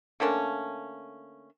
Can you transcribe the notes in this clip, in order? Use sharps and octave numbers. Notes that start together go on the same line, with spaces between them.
D3 A3 A#3 C#4